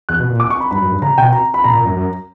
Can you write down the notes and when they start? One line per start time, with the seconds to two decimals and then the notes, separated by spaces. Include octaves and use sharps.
0.09 E2 F#6
0.19 B2
0.29 A#2
0.40 D6
0.50 C#6
0.60 B5
0.71 G2 B5
0.81 F#2
0.92 G2
1.02 C#3 A#5
1.18 B2 G5
1.33 A#5
1.54 B5
1.64 A#2 A#5
1.75 A#2
1.85 F#2
1.96 F#2